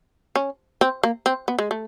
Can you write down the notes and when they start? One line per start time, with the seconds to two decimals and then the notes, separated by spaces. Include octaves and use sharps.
0.36 C#4
0.81 C4
1.03 A#3
1.26 C4
1.48 B3
1.59 G#3
1.71 A3